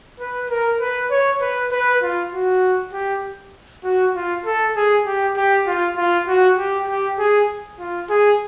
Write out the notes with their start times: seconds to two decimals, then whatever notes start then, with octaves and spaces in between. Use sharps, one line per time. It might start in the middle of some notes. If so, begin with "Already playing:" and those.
0.20 B4
0.50 A#4
0.80 B4
1.11 C#5
1.41 B4
1.71 B4
2.02 F4
2.32 F#4
2.93 G4
3.84 F#4
4.15 F4
4.46 A4
4.76 G#4
5.06 G4
5.37 G4
5.67 F4
5.97 F4
6.27 F#4
6.58 G4
6.88 G4
7.19 G#4
7.79 F4
8.10 G#4